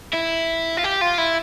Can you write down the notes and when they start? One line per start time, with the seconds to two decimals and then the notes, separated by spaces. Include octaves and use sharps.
0.14 E4
0.77 F4
0.84 G4
1.01 F4
1.18 E4